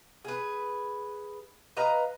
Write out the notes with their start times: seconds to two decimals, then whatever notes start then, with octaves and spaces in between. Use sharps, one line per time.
0.24 G#4 B4
1.77 B4 D#5 F5 A#5